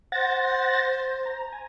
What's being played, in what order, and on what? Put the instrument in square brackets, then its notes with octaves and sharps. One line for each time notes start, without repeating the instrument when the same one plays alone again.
[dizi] C5 [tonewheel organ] F#5 A6 A#6
[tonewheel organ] A#5
G#5